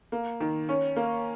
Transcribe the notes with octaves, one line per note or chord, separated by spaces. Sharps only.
A#3
D#3
C#4
A#3